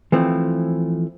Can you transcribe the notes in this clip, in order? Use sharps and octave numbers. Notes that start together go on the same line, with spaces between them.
E3 F3 A3 C4